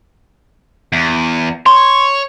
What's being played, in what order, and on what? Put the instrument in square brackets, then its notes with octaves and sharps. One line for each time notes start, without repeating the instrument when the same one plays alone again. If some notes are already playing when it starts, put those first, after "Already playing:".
[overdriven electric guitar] E2
[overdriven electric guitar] C#5 [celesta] C6